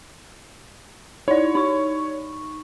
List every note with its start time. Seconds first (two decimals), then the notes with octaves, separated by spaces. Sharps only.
1.28 D#4 E4 C#5 D5
1.55 D#4 C#6